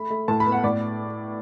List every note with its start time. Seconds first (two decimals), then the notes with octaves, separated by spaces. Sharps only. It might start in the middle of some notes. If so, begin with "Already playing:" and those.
Already playing: A3 B5
0.10 A3
0.28 A2 A5
0.40 B5
0.46 B3
0.52 F#5
0.64 A2 D5